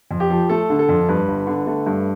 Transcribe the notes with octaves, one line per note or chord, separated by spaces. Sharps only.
F2
G4
F3
A3 A4
D3
A4
F2
G2 B4
G1
D3
A3
G2